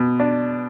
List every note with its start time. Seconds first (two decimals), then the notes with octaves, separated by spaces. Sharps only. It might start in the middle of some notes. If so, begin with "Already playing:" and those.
Already playing: B2
0.20 D4